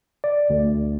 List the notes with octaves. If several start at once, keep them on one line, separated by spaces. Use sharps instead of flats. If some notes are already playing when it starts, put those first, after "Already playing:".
D5
D2